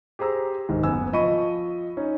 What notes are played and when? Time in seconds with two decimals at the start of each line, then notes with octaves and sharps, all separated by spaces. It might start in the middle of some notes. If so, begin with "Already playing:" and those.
0.19 G4 G#4 C5 A#5 E6
0.69 D1 G#2 D#3
0.83 F#1 B3 G#5 E6
1.13 F3 D#5 B5 C#6 D#7
1.97 C#4 D#4